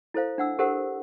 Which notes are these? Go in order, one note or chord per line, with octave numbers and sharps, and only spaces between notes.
E4 A4 C5 F5
D4 F#5 E6
G4 A4 A#4 C5 F#5